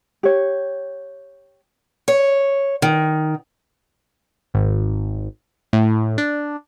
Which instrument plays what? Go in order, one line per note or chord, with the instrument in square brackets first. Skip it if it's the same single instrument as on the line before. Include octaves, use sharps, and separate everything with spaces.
[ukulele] G4 C#5
[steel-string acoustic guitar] C#5
D#3
[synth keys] G#1
A2
D4